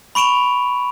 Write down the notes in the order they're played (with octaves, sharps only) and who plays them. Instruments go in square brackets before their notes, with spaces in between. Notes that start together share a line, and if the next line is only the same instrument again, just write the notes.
[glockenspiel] B5 C#6 D7 E7 F7